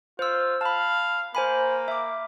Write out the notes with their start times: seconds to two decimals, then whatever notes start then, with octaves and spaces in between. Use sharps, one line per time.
0.19 F4 C5 E6
0.61 F5 A5 B5
1.35 A#3 C5 G#5 B5
1.88 E5 D6